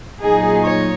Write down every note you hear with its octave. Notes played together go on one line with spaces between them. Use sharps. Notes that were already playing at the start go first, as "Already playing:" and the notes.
A#2 F#3 D#4 G#4
C#5